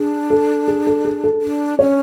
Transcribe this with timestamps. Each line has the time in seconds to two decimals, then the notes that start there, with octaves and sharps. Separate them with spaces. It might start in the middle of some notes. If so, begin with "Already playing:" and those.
Already playing: D4 G#4
0.30 A4
0.68 G#4
0.87 A4
1.05 G#4
1.24 A4
1.42 D4
1.79 C#4 C#5